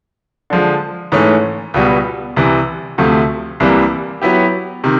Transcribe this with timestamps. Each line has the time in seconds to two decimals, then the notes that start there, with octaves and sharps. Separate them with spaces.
0.50 D3 F3 G#3
1.12 G#2 E3 A3 C#4
1.74 C#2 B2 G3 B3
2.36 C2 C3 E3
2.98 D2 C3 F3 A3
3.60 C2 C3 E3 G3 A#3
4.22 F#3 B3 E4 G4
4.84 C3 D#3